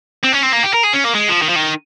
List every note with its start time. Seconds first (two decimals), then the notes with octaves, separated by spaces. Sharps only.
0.24 C4
0.33 C#4
0.43 C4
0.53 A#3
0.64 G4
0.74 A#4
0.84 G#4
0.94 C#4
1.05 A#3
1.15 G#3
1.29 F3
1.42 D#3
1.49 F3
1.56 D#3